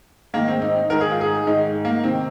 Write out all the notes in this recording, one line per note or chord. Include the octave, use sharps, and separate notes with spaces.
G#2 D#3 A#3
C4
D#4
D#4
G#2 D#3 A#4
G#4
F4
G#4
G#2 D#3 D#4
A#3
C3 D#3 C4